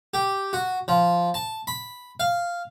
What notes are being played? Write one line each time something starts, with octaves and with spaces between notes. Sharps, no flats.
G4
F#4
F3
A5
B5
F5